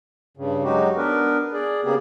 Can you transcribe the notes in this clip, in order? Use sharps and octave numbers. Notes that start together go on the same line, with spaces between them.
G2 C#3
F#3 G#3 D#4 F#4 G4
B3 D4 A#4 B4
G#4 D5
C#3 A#3 B3 G4 G#4